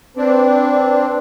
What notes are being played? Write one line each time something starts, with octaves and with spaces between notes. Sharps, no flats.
C4 D4 B4